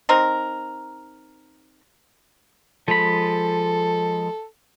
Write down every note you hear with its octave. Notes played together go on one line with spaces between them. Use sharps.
C4 D#4 A#4
F3 G#3 A4 B5